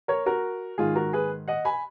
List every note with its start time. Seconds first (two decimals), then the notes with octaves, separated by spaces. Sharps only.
0.08 A#4 C#5
0.26 F#4 A#4
0.78 G#2 D#3 F4 G#4
0.95 F#4 A#4
1.13 G#4 B4
1.48 D#5 F#5
1.65 G#5 B5